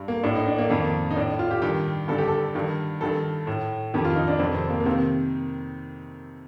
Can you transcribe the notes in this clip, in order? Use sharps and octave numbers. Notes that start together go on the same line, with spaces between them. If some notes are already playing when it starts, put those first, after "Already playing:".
Already playing: G2
A#3
A2 D4
D#4
D4
A#3
F2 D#3 A#3
D#4
A2 D4
F4
G4
G2 D#3 G4
G2 D3 A4
G4
A4
G2 D#3
G2 D#3 A4
A2
F2 D#3 G4
F4
D#4
D4
F2 C3 D#3 C4
C4
A#3
A#3
C3 D#3 C4